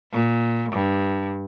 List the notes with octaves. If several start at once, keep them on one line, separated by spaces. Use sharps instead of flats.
A#2
G2